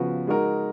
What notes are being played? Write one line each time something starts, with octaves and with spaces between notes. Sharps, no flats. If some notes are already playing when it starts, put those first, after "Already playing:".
Already playing: C#3 F3 B3 F#4 B4
G#3 D#4 F#4 A#4